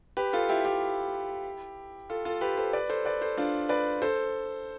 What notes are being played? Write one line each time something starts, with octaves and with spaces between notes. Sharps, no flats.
G4 B4
F4 A4
E4 G4
E4 G4
F4 A4
F4 A4
G4 B4
A4 C5
B4 D5
A4 C5
B4 D5
A4 C5
D4 F4
B4 D5
A4 C5